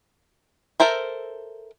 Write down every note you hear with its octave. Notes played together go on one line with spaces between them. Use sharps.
A4 A#4 C5 E5